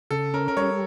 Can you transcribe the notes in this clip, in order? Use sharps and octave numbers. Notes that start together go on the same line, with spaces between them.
C#3 A4
C#4 A#4
A#4
G3 C#5